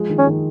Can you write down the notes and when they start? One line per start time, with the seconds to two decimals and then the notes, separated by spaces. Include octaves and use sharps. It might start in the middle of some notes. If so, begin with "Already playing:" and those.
Already playing: F3 G#3
0.10 D#3
0.19 C#4
0.27 D#3